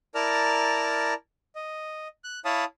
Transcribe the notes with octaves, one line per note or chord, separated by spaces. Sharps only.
E4 A#4 D5 A5 A#5 F6
D#5
F#6
E4 C#5 F5 A5 B5 D#6